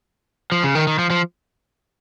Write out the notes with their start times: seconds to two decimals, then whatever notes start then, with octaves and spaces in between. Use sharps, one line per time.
0.52 F3
0.64 C#3
0.75 D#3
0.87 D#3
0.99 F3
1.10 F3